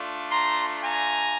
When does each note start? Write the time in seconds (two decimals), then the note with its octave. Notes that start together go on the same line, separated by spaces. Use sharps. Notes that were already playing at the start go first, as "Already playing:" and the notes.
Already playing: A3 D4 F4
0.31 A#5 C6
0.83 G#5 A#5